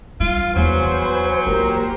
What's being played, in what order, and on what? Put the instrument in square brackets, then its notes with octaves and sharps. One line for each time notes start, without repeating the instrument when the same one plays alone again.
[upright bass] G3 [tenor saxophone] F4
[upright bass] E2 [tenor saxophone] F#3 [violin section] B4 C5 G#5
[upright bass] A#3 F4 [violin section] G4 A#4 C5